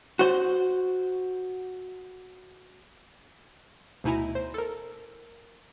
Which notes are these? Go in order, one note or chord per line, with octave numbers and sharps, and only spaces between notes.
F#4 C5
D2 B2 D#4 E4 G#5 A#5
C5
A4 A#4